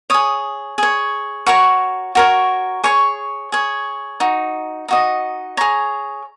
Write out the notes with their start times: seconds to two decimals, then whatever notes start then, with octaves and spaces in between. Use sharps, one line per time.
0.10 G#4 C#5 D#6
0.78 G#4 C#5
1.46 F#4 A#4 C#5 C#6
2.15 F#4 A#4 C#5
2.84 G#4 C#5 C#6
3.52 G#4 C#5
4.20 D#4 F#4
4.88 D#4 F#4 D#5
5.57 G#4 C#5 A#5